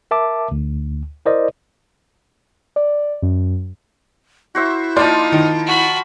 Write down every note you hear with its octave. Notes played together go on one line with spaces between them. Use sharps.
A#4 E5 A5 D6
D2
E4 A#4 C5 D5 D#5
D5
F#2
E4 F#4 C5 E5
F3 A#3 D#4 F4 D5 C6
D#3
F#4 B5